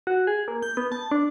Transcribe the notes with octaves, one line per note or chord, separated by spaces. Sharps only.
F#4
G#4
A#3
G6
B3
A5
D4